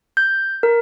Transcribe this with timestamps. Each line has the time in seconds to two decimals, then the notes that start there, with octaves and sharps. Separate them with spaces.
0.17 G6
0.63 A#4